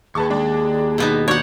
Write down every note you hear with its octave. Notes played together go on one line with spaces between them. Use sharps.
D#2 G#4 B4 A5 C#6
G#3 D4
B2 B3 D#4
D4 F#4 C#5 F#5 G6